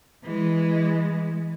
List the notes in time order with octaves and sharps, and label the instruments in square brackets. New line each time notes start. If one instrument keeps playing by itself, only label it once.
[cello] E3 G#3